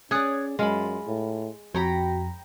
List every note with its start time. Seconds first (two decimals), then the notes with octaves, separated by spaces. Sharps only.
0.11 C#4 G#4 C#5 D5 D#6 F#6
0.59 F#2 G#3 F4 B5
1.07 A2
1.75 F2 F#4 C#5 G5 A#5 B5